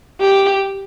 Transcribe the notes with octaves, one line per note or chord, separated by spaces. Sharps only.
G4